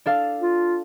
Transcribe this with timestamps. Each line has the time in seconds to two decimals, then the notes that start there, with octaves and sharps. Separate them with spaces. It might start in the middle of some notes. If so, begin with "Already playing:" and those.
0.06 D4 A4 F5
0.41 F4